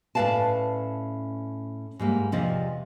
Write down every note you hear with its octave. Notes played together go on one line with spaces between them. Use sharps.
A2 C#4 B4 D5 F5 A5
G#2 G3 A#3
E2 C3 F3 D5 D#5